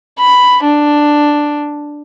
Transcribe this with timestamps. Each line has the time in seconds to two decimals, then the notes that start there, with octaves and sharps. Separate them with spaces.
0.19 B5
0.63 D4